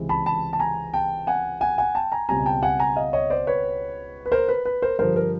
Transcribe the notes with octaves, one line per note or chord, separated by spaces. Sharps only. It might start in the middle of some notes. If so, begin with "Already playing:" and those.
Already playing: C#2 C3 E3 G#3 C4
A5 B5
A5 B5
A5
G#5 A#5
G5 A5
F#5 G#5
F#5 G#5
F#5 G#5
G5 A5
G#5 A#5
C#2 B2 G3 C4 G#5 A#5
G5 A5
F#5 G#5
G#5 A#5
D#5 F5
C#5 D#5
C5 D5
B4 C#5
B4
A#4 C5
B4
B4
A#4 C5
G2 D3 F3 A#4 C5
A#4